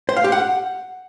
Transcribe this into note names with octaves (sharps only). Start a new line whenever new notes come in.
C5
F5
G4
F#5